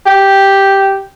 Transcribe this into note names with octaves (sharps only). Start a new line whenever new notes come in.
G4